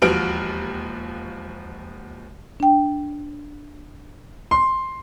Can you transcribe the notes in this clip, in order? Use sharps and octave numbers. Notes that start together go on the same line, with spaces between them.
E1 D#2 F3 F#4 F6 D7
D4 G5
C6